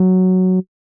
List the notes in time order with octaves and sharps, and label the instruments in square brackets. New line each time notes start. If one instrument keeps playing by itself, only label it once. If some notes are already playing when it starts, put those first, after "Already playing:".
Already playing: [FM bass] F#3